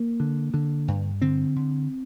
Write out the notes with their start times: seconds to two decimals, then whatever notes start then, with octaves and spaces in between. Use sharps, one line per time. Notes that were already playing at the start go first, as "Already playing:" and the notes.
Already playing: A#3
0.20 D3
0.54 D3
0.88 G2
1.22 D3 C4
1.56 D3